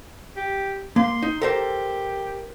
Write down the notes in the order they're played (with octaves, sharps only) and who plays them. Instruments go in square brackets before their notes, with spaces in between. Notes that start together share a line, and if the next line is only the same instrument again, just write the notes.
[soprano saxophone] G4
[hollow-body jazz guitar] A#3 [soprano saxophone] C6
[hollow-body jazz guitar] D#4
[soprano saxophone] G4 [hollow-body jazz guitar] A4 A#4 C5